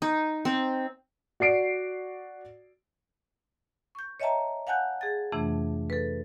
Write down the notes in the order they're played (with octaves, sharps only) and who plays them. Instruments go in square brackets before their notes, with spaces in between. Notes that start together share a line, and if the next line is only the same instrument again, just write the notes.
[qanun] D#4
C4
[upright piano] F#4 D5 C7 D7
[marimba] C#6 G6
C#5 D#5 E5 G5 A5 A#5
F5 F#5 G#5 A5 F#6 G6
G#4 A6
F2 C3 E3 A3 D4
A4 B4